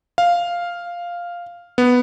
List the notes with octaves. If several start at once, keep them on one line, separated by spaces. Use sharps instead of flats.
F5
B3